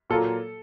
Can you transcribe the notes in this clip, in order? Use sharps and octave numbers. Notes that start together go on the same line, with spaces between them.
A#2 F#3 A#3 F4 A4